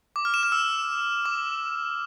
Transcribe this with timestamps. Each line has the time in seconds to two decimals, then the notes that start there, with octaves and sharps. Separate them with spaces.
0.16 D6
0.25 F6
0.34 E7
0.43 F6
0.52 E6
1.26 D6